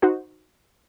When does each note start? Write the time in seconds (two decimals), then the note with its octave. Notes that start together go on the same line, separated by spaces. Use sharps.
0.02 D#4 F#4 C5